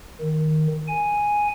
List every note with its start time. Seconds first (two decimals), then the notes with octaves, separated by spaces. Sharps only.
0.21 D#3
0.88 G#5